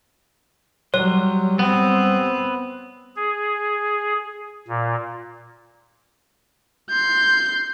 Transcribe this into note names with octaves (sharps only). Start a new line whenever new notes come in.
F#3 G3 C#5 C6
B3 C4
G#4
A#2
C6 G6